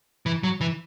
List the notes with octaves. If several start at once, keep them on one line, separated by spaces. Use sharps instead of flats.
E3
F#3
E3